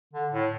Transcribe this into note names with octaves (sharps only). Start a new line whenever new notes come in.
D3
A2